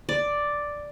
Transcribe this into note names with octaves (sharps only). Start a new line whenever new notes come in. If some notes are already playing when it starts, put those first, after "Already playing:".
D5